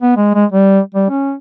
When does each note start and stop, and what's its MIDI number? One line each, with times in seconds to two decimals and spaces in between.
0.01 0.14 59
0.17 0.29 56
0.34 0.45 56
0.52 0.80 55
0.94 1.06 55
1.09 1.34 61